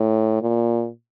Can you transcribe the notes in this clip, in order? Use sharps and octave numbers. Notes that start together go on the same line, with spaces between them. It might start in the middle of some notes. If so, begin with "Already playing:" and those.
Already playing: A2
A#2